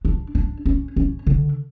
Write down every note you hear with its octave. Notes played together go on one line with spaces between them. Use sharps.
D4
D4
C#4
C#4
D3